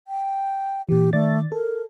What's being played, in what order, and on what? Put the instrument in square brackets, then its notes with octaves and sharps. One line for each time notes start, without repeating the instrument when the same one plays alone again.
[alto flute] G5
[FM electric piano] A#2 E3 [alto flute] G4
[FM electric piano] D#3 D5 A6 [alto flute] A3
[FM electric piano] A4 [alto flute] A#4